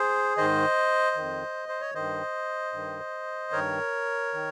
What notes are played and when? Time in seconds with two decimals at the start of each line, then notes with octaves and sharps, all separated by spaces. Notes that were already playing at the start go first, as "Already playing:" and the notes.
Already playing: G#4 C5
0.37 G#2 D#3 C5 D#5
1.16 F2 D#3
1.69 C5
1.81 C#5
1.95 G2 D#3 C5 D#5
2.72 G2 D#3
3.51 G2 D#3 A#4 C#5
4.34 D#3